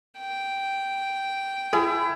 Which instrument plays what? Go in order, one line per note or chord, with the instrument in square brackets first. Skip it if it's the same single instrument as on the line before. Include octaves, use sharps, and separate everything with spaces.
[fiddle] G5
[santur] E4 [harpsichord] G#4